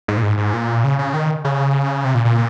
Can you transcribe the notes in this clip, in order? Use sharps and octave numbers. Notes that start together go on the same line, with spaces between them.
G#2
A#2
G#2
G#2
A#2
C#3
C#3
D#3
C#3
C3
A#2
A#2